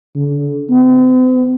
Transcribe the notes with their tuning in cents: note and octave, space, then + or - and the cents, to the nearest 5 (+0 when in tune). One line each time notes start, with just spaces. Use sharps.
D3 -35
C4 -45